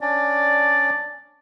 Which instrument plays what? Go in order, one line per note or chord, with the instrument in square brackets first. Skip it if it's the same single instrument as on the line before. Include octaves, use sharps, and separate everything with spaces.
[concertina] C#4 D4 [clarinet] D5